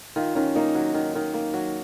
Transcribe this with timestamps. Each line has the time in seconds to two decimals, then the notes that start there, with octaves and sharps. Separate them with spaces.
0.16 D#3 F4
0.35 D#3 C#4
0.55 A#3 D#4
0.75 F#3
0.94 D#3
1.15 D#3
1.34 A#3
1.54 F#3